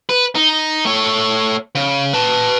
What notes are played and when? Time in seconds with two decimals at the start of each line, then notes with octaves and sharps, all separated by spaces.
0.09 B4
0.35 D#4
0.85 A3 C#5
1.75 C#3
2.13 B4 A5